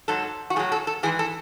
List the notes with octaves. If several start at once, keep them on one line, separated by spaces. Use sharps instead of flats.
G#2 F#3 A4
F#4
A2 F#3 G#4
A4
A4
G#2 E3 G#4
A4